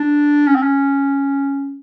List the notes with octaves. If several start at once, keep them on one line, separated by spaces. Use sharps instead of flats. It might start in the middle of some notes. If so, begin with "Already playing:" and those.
Already playing: D4
C#4
C4
C#4